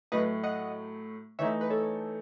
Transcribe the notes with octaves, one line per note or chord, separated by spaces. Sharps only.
A2 F#3 A3 B4 D#5
D#5 F#5
E3 A3 D#4 C#5 E5
B4
A4 C#5